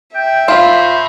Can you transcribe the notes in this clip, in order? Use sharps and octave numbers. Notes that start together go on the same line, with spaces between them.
E5 G5
F4 C5 A5 B5